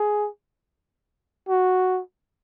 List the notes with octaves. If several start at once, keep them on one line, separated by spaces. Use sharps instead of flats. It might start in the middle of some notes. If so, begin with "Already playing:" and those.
Already playing: G#4
F#4